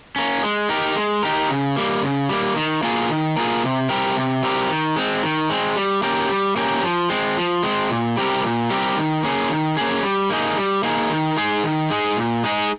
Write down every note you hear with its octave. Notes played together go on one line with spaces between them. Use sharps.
A#3 C#4
G#3
D#4 G4 A#4
G#3
D#4 G4 A#4
C#3
G3 A#3
C#3
G3 A#3
D#3
A#3 F4 G#4
D#3
A#3 F4 G#4
C3
G3 C4 G4 A#4
C3
G3 C4 G4 A#4
D#3
G#3 C4
D#3
G#3 C4
G3
A#3 C#4 G4 A#4
G3
A#3 C#4 G4 A#4
F3
G#3 C4
F3
G#3 C4
A#2
G3 C4 G4 A#4
A#2
G3 C4 G4 A#4
D#3
A#3 C#4 G#4
D#3
A#3 C#4 G#4
G3
A#3 D#4 G#4
G3
A#3 D#4 G#4
D#3
G#3 D#4 G#4
D#3
G#3 D#4 G#4
A#2
G#3 D#4 G#4